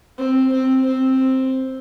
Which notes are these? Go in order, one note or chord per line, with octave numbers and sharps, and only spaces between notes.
C4
C4
C4